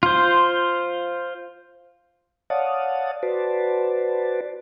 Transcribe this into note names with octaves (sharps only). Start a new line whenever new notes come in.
F4 C5
C#5 D5 F5 F#5 A5 D#6
F#4 B4 C5 D5 A5